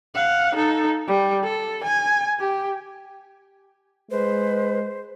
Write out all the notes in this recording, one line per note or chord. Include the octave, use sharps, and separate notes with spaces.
F5 F#5
D#4 A4
G3
A4
G#5
G4
G#3 B4 C5